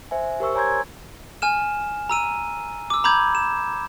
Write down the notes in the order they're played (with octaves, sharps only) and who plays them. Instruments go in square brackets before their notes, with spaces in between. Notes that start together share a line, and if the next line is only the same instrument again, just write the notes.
[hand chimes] C5 E5 G#5
G4 A#4 C5 C#6 E6
C#5 G#5 A#5 C6 G6 G#6
[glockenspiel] G#5 F6 E7
A#5 E6 D#7
D6 E6
A#5 B5 D6 G6 G#6
E7